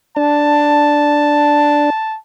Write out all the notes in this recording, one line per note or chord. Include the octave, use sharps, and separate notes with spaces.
D4 A5